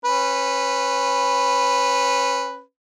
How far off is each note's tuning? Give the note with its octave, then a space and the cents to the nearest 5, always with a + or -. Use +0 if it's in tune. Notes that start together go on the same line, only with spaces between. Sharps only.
C#4 -25 B4 +0